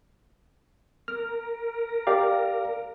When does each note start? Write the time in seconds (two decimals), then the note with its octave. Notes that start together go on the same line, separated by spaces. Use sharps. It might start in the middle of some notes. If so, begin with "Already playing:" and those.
1.08 A#4 F6
2.07 G4 D5 F5